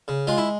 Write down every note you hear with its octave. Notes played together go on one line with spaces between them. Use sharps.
C#3
G#3 F4
E4